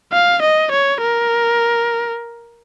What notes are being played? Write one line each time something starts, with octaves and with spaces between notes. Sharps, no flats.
F5
D#5
C#5
A#4